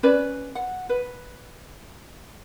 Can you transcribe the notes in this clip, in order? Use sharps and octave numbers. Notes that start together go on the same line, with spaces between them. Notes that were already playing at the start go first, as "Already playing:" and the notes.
C#4 B4 D5
F#5
B4